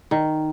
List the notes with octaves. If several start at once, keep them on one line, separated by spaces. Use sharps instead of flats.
D#3